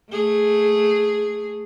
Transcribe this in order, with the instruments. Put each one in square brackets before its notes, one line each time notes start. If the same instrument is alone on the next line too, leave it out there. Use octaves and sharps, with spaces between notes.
[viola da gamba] A3 G#4